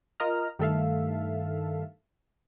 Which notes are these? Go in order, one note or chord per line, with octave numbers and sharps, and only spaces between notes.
F4 A#4 D#5 A#5 F6
G2 D#3 A3 A4 E5 F5